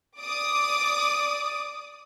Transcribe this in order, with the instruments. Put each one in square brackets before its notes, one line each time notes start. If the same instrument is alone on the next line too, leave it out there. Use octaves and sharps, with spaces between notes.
[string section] D5 D6 D#6